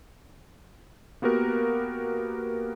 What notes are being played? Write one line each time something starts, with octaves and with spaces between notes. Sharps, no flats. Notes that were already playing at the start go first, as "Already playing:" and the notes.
A#3 B3 F#4 G4 A#4